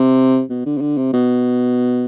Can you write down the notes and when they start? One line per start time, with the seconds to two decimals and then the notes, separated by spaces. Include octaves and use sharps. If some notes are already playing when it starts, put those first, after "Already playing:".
Already playing: C3
0.50 B2
0.66 D3
0.77 C3
0.81 D3
0.97 C3
1.13 B2